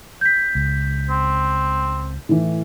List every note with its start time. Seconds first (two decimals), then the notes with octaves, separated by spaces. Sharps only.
0.21 G6 B6
0.55 C#2
1.10 C4
2.29 A2 E3